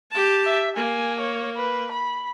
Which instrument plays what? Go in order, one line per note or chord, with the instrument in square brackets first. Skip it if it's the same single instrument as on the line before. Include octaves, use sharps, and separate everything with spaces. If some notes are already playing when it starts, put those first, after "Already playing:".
[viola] G4 A5
[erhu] E5
[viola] A#3 [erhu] G#5
[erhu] C#5
B4
B5